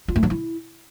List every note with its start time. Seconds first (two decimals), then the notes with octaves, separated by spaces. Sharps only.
0.08 F4
0.16 A3
0.23 F3
0.30 E4